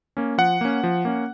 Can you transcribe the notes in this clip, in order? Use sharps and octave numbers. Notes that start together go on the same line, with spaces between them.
A#3 C#4
F3 F#5
A#3 C#4
F3
A#3 C#4